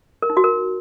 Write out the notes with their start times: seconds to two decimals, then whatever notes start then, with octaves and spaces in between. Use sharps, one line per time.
0.22 A#4
0.30 D#4
0.37 F#4
0.44 A#4